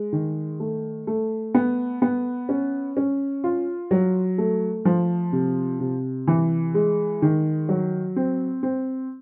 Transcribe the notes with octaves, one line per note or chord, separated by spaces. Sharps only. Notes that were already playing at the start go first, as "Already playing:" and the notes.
Already playing: G#3
D#3
A3
A3
B3
B3
C#4
C#4
F4
F#3
A3
F3
C3
C3
E3
G#3
D#3
F#3
C4
C4